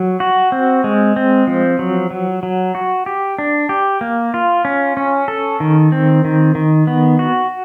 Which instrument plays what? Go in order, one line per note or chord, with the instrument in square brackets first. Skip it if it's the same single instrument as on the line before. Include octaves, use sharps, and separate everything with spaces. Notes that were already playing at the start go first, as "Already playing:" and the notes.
Already playing: [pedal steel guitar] F#3
F#4
C4
G#3
C4
F3
F#3
F#3
F#3
F#4
G4
D4
G4
A#3
F4
C#4
C#4
A4
D#3
C4
D#3
D#3
B3
F#4